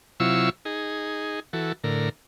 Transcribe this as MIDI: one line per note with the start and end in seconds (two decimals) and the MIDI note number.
0.20 0.50 48
0.20 0.50 54
0.20 0.50 64
0.20 0.50 65
0.20 0.50 85
0.20 0.50 88
0.65 1.40 63
0.65 1.40 68
1.53 1.72 52
1.53 1.72 66
1.53 1.72 69
1.84 2.09 45
1.84 2.09 50
1.84 2.09 70